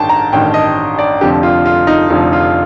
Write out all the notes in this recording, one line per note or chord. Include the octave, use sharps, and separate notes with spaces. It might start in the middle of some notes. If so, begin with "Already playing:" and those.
Already playing: A1 G2 D#3 G5 A5
A#5
A1 G2 D#3 G5
D#5
D5
F1 F2 D3 F3 G4
F4
F4
D#4
F1 F2 D3 F3 D#4
F4